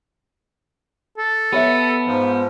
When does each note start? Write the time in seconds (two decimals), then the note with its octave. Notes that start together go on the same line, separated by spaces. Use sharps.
1.18 A4
1.53 B3 G4 C#5 E5
2.06 G#2 F3